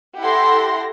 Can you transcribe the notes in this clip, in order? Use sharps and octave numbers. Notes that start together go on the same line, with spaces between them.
E4 G4 A4 F#5 C6 A#6